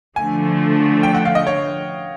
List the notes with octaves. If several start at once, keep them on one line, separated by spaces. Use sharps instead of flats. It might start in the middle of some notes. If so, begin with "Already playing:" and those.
D3 F3 A3 G#5
G5
F#5
F5
D#5
C#5